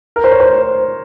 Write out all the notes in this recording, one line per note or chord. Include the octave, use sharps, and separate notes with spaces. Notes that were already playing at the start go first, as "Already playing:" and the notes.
A#4
C5
C#5
C5